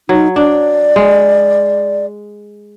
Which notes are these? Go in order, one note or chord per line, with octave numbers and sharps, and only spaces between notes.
F#3 D#4
D4 D5
G#3